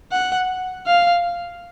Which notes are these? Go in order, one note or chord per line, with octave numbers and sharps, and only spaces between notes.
F#5
F5